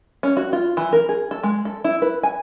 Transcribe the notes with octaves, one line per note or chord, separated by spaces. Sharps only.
C#4
F#4
F4
E3
A#4
G#4
A4
G#3
A4
E4
B4
G#5